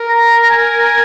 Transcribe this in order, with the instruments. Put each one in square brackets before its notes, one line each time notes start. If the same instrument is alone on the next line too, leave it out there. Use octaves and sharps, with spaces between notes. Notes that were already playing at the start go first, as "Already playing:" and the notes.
Already playing: [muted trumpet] A#4
[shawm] A#5
A#5
G#5